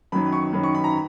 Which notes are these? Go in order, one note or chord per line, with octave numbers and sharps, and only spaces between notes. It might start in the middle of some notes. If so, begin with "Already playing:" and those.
F#2 D#3 F#3 B5
C#6
F#2 D#3 F#3 B5
C#6
B5
A#5